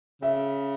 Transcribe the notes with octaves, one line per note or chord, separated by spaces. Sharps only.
C#3 E5